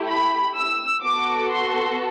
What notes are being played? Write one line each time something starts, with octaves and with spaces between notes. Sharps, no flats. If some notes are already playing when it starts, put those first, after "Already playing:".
Already playing: A3 E4 G4
B5
E6
B3 F#4 A4 D6
C6